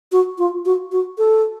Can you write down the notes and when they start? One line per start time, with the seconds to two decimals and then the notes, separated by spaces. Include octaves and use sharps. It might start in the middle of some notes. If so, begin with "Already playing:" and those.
0.12 F#4
0.38 F4
0.66 F#4
0.92 F#4
1.18 A4